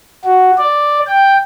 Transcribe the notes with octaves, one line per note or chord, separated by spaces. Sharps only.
F#4
D5
G5